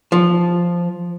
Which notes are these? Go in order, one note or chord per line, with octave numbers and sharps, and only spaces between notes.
F3